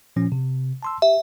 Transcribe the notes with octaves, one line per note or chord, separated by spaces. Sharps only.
A#2 F3 C#4
C3
A5 C6 E6
G4 E5